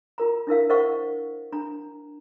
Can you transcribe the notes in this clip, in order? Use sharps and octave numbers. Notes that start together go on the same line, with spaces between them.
F4 A#4 A#5
D4 E4 A#4 F5
A#4 C5 D#5 F5 F#5 C#6
D4 A#5